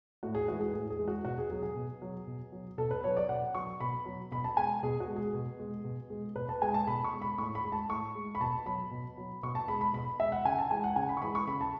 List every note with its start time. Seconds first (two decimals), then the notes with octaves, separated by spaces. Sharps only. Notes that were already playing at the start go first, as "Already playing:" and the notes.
0.23 A2 F#4
0.35 G#4
0.48 E3 G#3 F#4
0.61 G#4
0.73 A2 G#4
0.90 G#4
0.99 E3 G#3
1.08 F#4
1.25 B2 F#4
1.38 G#4
1.50 F#3 G#4
1.63 G#4
1.76 B2
2.02 F#3
2.27 B2
2.52 F#3
2.78 B2 A4
2.91 B4
3.04 F#3 C#5
3.17 D5
3.29 B2 F#5
3.55 F#3 C#6
3.80 B2 B5
4.05 F#3
4.31 B2 B5
4.44 A5
4.57 G#3 G#5
4.83 B2 G#4
5.00 F#4
5.08 G#3
5.16 G#4
5.34 B2
5.59 G#3
5.84 B2
6.10 G#3
6.36 B2 B4
6.49 A5
6.62 G#3 G#5
6.74 A5
6.87 B2 B5
7.04 C#6
7.13 G#3
7.22 B5
7.38 A2 C#6
7.55 B5
7.64 G#3
7.72 A5
7.89 A2 C#6
8.15 G#3
8.35 B5
8.40 B2 A5
8.66 F#3 B5
8.91 B2
9.17 F#3
9.43 B2 C#6
9.55 A5
9.68 G#3 B5
9.81 B5
9.93 B2 B5
10.20 G#3 E5
10.32 F#5
10.45 C#3 G#5
10.59 A5
10.70 E3 G#3 G#5
10.84 F#5
10.96 C#3 G#5
11.09 B5
11.17 C#6
11.21 E3 G#3 B5
11.35 C#6
11.47 C#3 B5
11.61 A5